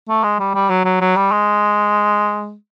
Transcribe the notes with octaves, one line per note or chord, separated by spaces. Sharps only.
A3
G#3
G3
G3
F#3
F#3
F#3
G3
G#3